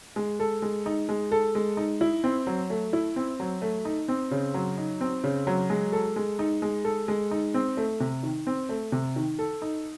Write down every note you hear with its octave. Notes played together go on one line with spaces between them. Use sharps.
G#3
A4
G#3
D#4
G#3
A4
G#3
D#4
E4
C4
F#3
A3
E4
C4
F#3
A3
D#4
C4
C#3
F#3
D#4
C4
C#3
F#3
G#3
A4
G#3
D#4
G#3
A4
G#3
D#4
C4
A3
C3
D#3
C4
A3
C3
D#3
A4
D#4